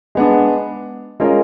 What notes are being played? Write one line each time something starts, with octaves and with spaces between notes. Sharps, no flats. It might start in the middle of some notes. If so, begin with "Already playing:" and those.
G#3 B3 D4
G#3 C#4 F4 A#4